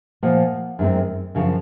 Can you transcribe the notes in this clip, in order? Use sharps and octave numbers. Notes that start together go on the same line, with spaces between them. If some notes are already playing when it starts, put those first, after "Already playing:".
A#2 F3 A#3 F#5
F#2 D#3 G#3 C4
F#2 C#3 F3